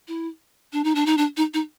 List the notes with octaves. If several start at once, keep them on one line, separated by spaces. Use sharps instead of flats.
E4
D4
D#4
D4
D#4
D4
D#4
D#4